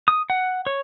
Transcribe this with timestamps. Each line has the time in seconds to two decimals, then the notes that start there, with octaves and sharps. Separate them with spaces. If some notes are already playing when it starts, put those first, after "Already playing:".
0.08 D#6
0.30 F#5
0.67 C#5